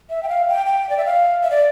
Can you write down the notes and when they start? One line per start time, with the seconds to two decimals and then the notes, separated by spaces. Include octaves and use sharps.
0.10 E5
0.23 G5
0.29 F5
0.48 G5
0.66 G5
0.90 D5
0.98 E5
1.05 F5
1.43 E5
1.51 D5